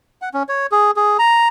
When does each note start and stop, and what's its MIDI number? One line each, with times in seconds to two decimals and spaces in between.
0.22 0.29 78
0.34 0.43 61
0.49 0.67 73
0.72 0.91 68
0.96 1.17 68
1.19 1.48 82